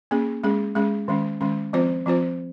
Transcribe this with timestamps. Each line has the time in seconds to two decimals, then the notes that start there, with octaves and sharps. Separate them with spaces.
0.11 A#3 C#4 G#4
0.44 G#3 C#4 G#4
0.75 G#3 C#4 G#4
1.08 D#3 G#3 C#4
1.41 D#3 G#3 C#4
1.73 F3 C4 F4 C5
2.06 F3 C4 F4 C5